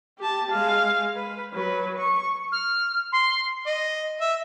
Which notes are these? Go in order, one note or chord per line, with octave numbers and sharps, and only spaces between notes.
G4 A5
G#3 F5
B4
F#3 B4
C#6
F6
C6
D#5
E5